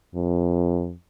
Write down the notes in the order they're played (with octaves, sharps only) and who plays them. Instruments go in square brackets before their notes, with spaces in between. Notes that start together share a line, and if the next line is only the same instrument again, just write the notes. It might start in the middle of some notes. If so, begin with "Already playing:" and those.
[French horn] F2